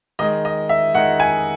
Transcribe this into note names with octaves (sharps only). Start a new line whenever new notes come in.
D#3 G#3 D#5
D#5
E5
D#3 G#3 F#5
G#5